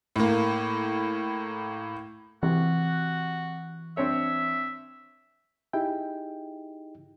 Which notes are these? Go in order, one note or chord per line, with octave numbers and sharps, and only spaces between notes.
A2 A#3
C3 E3 F#4
C4 D4 C#5 E5
D#4 E4 G4 G#4 G5